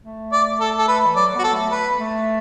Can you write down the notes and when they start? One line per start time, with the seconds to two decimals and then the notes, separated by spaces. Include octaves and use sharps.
0.05 A3
0.32 D5
0.60 A4
0.78 A4
0.88 B4
1.06 E3
1.16 F#3 D5
1.35 B3 F#4
1.44 A4
1.53 A3
1.71 B4
1.99 A3